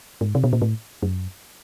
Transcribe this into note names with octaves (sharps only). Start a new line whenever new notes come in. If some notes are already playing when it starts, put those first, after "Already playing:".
G#2
C3
B2
A#2
A2
F#2